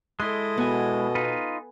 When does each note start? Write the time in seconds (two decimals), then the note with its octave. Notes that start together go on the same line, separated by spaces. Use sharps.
0.20 G#3 E4 A4 D#5 C6
0.57 B2 B3 G#5
1.15 D#4 F4 B4